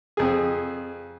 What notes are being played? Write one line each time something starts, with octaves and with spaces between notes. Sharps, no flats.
F2 G#4